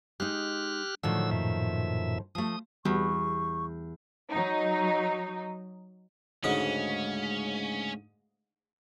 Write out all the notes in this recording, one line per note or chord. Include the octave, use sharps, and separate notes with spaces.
G#3 D#4 G4 F6 F#6
A2 D3 D#3 F3 F#3 E6
F#2 A#2 E5
F3 A3 D#6
E2 G3 B3 F#4 C#6
F#3 D#4
D2 G#2 C#3 C#4